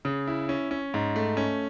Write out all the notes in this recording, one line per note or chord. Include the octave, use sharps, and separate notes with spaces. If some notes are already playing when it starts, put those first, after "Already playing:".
C#3
E4
C#4
C#4
G#2
A3
C#4